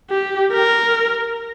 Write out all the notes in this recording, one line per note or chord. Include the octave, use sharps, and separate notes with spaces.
G4
A#4